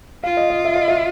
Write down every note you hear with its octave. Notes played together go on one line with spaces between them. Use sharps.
F4 F5
D#5
D#5
E5
D#5
E5